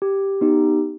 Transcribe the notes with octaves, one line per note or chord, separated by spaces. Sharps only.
G4
B3 D#4 G4